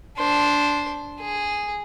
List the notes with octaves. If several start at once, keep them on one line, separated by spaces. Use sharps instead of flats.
D4 C5
G#4